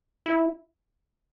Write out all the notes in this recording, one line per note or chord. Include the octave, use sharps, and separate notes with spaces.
E4